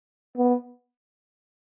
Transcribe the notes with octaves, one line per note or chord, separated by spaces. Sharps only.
B3